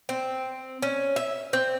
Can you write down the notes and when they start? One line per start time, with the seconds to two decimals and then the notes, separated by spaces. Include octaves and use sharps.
0.09 C4
0.82 C#4
1.16 E5
1.53 C4